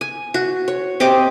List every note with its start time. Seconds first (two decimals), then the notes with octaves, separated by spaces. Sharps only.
0.01 G#5
0.34 F#4
0.68 C#5
1.00 C4 G4 D#5 D6